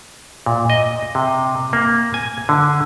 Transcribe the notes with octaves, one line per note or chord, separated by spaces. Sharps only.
A#2
D#5
C3
A#3
G#5
D3